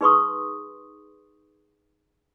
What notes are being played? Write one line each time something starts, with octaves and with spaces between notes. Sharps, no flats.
D#4 G#4 B4 C6 C#6 D#6